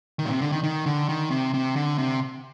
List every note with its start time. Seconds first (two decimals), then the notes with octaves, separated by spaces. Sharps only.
0.19 D#3
0.25 A#2
0.30 C3
0.41 D3
0.52 D#3
0.63 D#3
0.86 D3
1.09 D#3
1.31 C3
1.54 C3
1.76 D3
1.98 C3